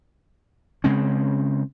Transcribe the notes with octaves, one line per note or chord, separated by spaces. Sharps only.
C#3 G#3 C4 C#4